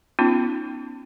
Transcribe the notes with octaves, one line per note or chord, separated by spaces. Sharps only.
B3 C#4 D#4 F4